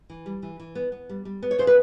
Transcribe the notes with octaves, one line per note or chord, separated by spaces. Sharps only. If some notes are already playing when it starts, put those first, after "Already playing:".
E3
G3
E3
E3
B3
B3
G3
G3
B3
C#5
C#3 C5
B4